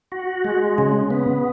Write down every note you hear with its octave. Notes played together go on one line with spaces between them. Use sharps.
F#4
G#3
C#3
B3